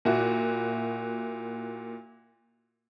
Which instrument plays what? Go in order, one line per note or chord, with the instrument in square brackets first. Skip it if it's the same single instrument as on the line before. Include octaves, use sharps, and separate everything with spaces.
[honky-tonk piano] A#2 E4 F#4